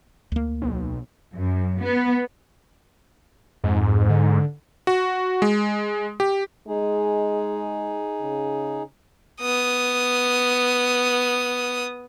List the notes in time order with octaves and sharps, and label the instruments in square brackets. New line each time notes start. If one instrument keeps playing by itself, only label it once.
[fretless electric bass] D2 A#3
[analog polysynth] B1
[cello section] F#2
B3
[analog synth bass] F2 [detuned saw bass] G#2
[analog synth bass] D3
[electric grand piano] F#4
G#3
G4
[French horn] G#3 [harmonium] D#4 G#4
[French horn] C#3
[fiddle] B3 D#6